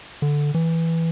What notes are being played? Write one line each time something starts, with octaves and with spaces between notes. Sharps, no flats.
D3
E3